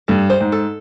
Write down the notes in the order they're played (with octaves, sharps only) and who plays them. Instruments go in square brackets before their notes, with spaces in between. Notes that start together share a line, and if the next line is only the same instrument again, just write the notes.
[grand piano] G2 [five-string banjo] A4
[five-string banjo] C5
[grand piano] G#2
[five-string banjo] A4